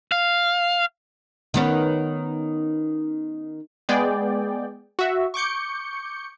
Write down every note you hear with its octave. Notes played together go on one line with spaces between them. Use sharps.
F5
D#3 B3 C#4
G#3 B3 G#4 D5 G5
F#4 E5
C#6 D6 G6 C#7